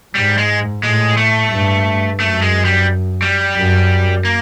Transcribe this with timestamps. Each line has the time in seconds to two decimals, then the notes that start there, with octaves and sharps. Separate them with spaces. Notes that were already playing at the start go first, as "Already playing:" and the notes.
0.15 G#2 G3
0.38 G#3
0.83 A2 G#3
1.17 A3
1.51 G2
2.19 F#2 A3
2.42 G#3
2.65 G3
3.22 G3
3.56 F#2
4.25 A#3